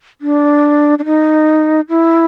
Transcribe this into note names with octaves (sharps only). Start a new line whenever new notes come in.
D4
D4
D#4
E4